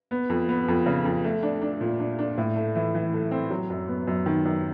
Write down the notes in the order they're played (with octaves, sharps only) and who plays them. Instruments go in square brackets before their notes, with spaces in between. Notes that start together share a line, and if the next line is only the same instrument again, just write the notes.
[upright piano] B3
F2
B3
F2
C#3
F2
A3
D4
D4
A#2
D4
D4
A2
A3
E3
E3
A3
C4
F#3
F#2
B3
F#2
D#3
F#2